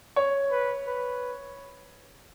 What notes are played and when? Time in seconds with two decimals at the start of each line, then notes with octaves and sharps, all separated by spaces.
0.16 C#5
0.51 B4
0.87 B4